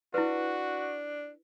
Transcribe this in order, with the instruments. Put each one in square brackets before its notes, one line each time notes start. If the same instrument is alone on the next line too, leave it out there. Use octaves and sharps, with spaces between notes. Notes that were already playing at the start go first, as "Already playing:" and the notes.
[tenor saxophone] D4 [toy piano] E4 B4 [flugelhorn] F#4